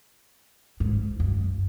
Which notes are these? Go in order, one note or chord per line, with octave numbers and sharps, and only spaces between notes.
G#2
F#2